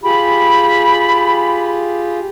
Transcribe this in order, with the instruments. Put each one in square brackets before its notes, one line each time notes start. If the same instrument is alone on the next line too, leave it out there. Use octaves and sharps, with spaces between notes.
[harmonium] F4 G4 G#4 [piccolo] B5